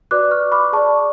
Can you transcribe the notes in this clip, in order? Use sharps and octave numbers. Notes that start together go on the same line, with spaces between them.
F#4 B4 D5 D6 F#6
C#6 F6
B5 D6
G#4 D5 A5 C#6